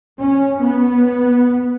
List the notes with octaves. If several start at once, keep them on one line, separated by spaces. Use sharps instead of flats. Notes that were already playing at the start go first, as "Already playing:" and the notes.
C#4
B3